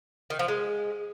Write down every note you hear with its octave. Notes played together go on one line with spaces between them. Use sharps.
D#3
F3
G#3